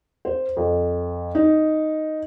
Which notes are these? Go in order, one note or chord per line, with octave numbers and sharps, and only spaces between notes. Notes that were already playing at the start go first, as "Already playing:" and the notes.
C5
F2
D#4